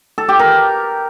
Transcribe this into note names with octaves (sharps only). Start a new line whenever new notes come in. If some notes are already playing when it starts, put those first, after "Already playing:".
A4
G4
A#4